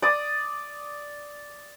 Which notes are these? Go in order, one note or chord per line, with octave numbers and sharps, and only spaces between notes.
D5 D#6